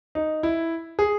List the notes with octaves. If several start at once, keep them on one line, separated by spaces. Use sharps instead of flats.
D#4
E4
G#4